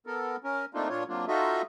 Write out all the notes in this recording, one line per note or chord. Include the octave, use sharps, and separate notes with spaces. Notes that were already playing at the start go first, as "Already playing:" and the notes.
B3 A4 A#4
C#4 A#4
A3 A#3 C4 D4 D#4 F4
A#2 D4 F4 C#5
C3 F#3 A#3 D4 F4
D#4 F4 F#4 A4 D#5 E5